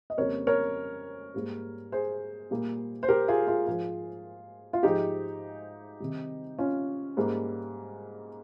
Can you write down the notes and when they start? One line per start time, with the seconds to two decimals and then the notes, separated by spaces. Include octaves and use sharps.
0.10 D#5
0.18 F2 C#3 G3 A#3 A#4 C#5
0.47 A#4 C#5
1.34 G#2 G3 A#3
1.92 G#4 C5
2.50 A#2 G3 A#3
3.03 C5
3.08 G4 A#4
3.28 F4 G#4
3.47 F4 G#4
3.67 G#2 F3 G#3 F4 G#4
4.73 F4
4.83 G#2 F3 G#3 D#4 G4
6.00 C3 D#3 G3
6.58 C#4 F4
7.17 G#2 G3 A#3